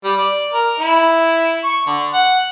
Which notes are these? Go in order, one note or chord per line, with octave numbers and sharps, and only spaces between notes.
G3
D5
A#4
E4
C#6
D3
F#5